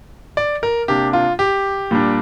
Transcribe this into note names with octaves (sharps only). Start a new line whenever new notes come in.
D5
A#4
C3 A#3 D4 G4
F4
G4
A#2 G3 D4